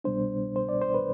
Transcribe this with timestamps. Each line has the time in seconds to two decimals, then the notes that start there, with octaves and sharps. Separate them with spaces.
0.04 C2 B2 G3 B3 D4 C5
0.56 C5
0.69 D5
0.81 C5
0.94 B4